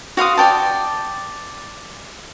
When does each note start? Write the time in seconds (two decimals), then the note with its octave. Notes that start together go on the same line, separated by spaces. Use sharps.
0.17 F#4 F5 C6 D#6
0.37 D5 G5 A5